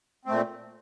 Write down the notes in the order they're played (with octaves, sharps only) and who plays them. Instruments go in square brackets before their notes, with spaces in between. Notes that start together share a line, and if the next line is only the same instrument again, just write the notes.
[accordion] A#2 A3 C4